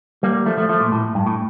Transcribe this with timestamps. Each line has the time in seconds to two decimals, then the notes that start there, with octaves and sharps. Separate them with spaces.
0.23 G3 A#3
0.46 F3 A3
0.57 F3 A3
0.69 F3 A3
0.80 A#2
0.92 A2
1.15 G2
1.27 A2